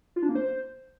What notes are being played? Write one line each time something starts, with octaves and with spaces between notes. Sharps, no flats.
F4
D4
A#3
C5